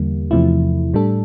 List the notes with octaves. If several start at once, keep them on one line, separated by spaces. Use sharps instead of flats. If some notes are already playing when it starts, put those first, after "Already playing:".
Already playing: E2 D3 G3 A#3
E2 C3 F3 A3 E4
A2 G3 D4 A4